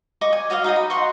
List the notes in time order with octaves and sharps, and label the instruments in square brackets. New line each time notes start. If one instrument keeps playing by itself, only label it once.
[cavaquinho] D#5 C#6 D6
G#5
F#4 C#5 D#5 F5
D#4 F#4 G#4 D#6
B5
F#4 F#5 C6 C#6